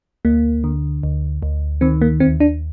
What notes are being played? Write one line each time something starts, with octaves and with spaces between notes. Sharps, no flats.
D2 A#3
D3
D2
D2
D#3 C4
A#3
D#2 C4
D4